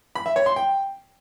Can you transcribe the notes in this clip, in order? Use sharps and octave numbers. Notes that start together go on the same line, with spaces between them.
B5
E5
C#5
C6
G5